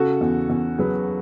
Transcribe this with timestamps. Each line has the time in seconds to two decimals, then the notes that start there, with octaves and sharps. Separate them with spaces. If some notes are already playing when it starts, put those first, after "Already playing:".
Already playing: C#3 F#4 A4
0.21 E2
0.50 E2
0.78 F#3 G#4 B4